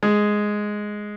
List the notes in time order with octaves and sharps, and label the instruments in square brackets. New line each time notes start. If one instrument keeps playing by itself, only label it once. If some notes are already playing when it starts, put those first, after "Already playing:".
[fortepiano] G#3